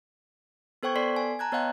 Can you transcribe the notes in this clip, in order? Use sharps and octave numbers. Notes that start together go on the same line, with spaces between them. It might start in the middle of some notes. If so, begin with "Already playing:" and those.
B3 A4 C5 G5 C#6 G#6
B3 A4 D5 C6 B6 C7
G#5
A5 A#5 F#6 G#6
B3 C#5 D#5 F5 G5 F#6